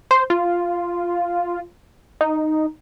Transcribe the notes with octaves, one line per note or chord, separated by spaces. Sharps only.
C5
F4
D#4